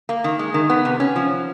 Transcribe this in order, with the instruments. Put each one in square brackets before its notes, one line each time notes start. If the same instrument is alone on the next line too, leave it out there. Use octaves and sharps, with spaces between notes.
[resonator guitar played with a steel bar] A#3
D#3
G#3
D#3
B3
C3
C#4
F3